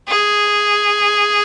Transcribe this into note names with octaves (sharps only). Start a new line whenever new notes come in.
G#4